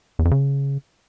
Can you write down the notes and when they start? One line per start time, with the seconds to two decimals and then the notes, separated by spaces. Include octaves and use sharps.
0.19 E2
0.25 F2
0.31 C#3